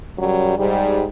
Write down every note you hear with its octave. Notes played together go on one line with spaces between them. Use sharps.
F#2 C#3 F#3 G3
G#2 G3